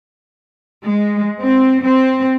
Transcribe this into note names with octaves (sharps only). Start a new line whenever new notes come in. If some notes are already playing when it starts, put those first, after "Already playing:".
G#3
C4
C4